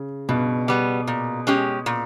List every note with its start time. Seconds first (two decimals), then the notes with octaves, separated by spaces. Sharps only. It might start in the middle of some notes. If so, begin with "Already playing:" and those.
Already playing: C#3
0.29 G2 B2
0.68 G3 B3
1.07 A#2
1.47 G#3 C#4 G4
1.86 A#2